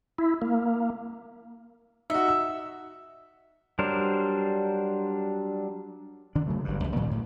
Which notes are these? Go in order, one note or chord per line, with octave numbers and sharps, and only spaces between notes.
E4
A#3
D#4 F#4 E5
E6
F#3 G3 D4 A#4 C5
D#3 D4
C#3 F#3 A3
G1 G2
C#2 F3
A#2 D#3 F#3 G#3
D2 A2